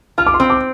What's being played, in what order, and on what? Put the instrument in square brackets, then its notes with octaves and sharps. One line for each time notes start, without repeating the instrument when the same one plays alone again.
[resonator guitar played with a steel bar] F4 [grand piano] F6
[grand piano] D6
C6
[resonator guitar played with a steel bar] C4
[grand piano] D6